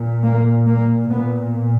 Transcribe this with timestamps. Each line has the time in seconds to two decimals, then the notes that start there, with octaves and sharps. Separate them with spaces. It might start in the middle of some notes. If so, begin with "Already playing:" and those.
Already playing: A#2
0.24 A#3
0.67 A#3
1.11 A#2 B3